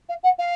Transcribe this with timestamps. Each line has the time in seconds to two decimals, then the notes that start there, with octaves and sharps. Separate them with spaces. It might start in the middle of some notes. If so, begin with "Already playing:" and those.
0.09 F5
0.23 F#5
0.39 F5